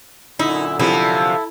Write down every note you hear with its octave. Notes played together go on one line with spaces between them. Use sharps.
F#2 A#2 D3 D#4 E4
C3 F3 E4 A4